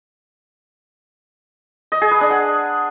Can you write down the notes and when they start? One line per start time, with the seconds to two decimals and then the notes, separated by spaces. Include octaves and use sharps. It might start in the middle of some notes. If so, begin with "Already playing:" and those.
1.92 D#5
2.02 G#4
2.11 B4
2.21 D4
2.31 F#5